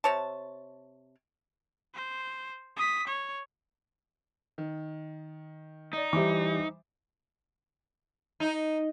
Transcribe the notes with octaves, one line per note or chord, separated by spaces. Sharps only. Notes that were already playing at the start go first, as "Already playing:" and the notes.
C3 C#5 A5
C5
D#6 B6
C#5
D#3
D#4 D5 D#5
E3 G3 C5 E5 D6
D#4